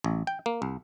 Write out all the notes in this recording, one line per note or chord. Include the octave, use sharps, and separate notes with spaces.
A1
G5
A#3
C2